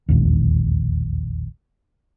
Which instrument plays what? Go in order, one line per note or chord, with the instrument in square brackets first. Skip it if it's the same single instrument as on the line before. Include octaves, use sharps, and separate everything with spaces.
[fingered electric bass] E1 A#1 D#2